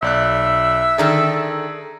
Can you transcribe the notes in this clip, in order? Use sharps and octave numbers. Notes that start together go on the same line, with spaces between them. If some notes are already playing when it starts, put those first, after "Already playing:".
B1 D5 E5 F#6
D3 D#3 G#4 A4 D5 A#5